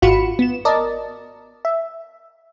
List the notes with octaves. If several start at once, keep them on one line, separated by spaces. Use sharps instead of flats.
G#1 F4 F#4 B5 C#7 E7
B3 E7
A#4 D5 D#5 A5
E5